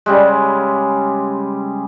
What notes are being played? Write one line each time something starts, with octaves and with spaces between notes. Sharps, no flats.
C#3 G3 G#3